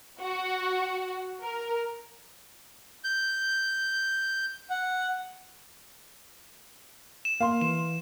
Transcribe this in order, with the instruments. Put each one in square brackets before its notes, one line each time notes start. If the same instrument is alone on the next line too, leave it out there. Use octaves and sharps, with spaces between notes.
[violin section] F#4
A#4
[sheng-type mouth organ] G6
F#5
[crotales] E7
[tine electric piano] A#3 [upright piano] F5 C6
[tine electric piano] E3 [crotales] E7